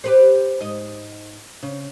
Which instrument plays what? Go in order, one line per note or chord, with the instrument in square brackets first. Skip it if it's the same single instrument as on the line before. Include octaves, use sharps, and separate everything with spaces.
[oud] G4 B4 C5
G#2 D#5
C#3